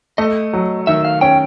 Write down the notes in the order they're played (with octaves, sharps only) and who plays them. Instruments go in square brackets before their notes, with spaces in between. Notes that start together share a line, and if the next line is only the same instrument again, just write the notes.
[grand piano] A3 [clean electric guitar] D#5
[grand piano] F#3
[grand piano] D#3 [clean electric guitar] E5
[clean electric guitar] F5
[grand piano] C#4 [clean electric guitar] G5